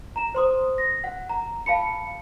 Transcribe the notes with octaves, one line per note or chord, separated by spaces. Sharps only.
A#5 E7
C5 C6 D#6
A#6
F#5
A#5
F5 A5 B5 C#7